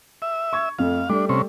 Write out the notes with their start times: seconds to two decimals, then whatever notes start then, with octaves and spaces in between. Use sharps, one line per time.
0.22 E5
0.53 C#6 G#6
0.79 F2 A3 F5
1.09 G3 A3 D4
1.29 C3 C#4